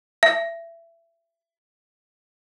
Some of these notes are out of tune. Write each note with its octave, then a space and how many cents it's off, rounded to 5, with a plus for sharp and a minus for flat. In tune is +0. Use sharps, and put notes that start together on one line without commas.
E5 +25